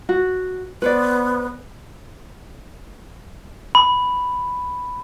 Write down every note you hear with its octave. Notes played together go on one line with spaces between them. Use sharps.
F#4
B3 B4 C5 D5
B5